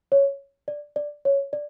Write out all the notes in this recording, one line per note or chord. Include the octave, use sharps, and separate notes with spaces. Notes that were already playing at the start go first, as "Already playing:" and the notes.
C#5
D5
D5
C#5
D5